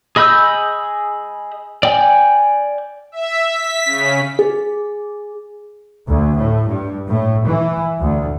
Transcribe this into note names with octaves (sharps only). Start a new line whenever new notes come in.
G#4 D#5 B5 E6 G6
D5 G5 G#5
E5
B6
C#3
G#4
D2
A2
G2
A2
E3
D2